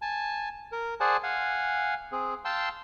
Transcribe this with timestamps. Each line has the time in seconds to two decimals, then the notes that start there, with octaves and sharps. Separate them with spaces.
0.02 G#5 A5
0.72 A#4
1.00 G#4 C5 D5 F#5 G#5 A5
1.23 F5 F#5 G#5
2.12 C4 G#4
2.45 F5 G5 A5 C6 E6